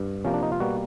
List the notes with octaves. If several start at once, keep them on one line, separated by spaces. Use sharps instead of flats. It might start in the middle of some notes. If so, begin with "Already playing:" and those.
Already playing: G2
C3 F3 A#3 C#4
D4
D#4
F4
B2 G3 A#3 F#4